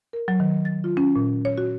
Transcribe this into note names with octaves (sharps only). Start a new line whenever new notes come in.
A#4
F#3
D#3
A6
F4
C#4
A#2
C#5
F#4